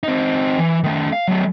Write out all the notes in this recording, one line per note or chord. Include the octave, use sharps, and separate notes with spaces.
C4 D#4
E3
D#3 A3
F5
F#3 A3